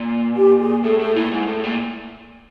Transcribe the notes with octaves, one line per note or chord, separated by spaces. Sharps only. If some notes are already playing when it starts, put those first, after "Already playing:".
Already playing: A#2
G4
G#4
A2 A4
A2 A4
A#2 E4
G#2
A2
A#2